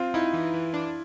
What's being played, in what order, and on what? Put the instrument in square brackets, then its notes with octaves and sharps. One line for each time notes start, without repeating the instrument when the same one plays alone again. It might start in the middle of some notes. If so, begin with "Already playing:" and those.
Already playing: [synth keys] C4 [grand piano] F4
[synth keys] D#4 [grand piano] E4
[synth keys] E3
E3
D4